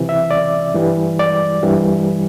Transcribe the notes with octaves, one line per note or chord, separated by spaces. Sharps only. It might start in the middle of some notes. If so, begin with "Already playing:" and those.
Already playing: C2 C3 E3
E5
D5
G2 E3 G3
D5
G2 E3 G3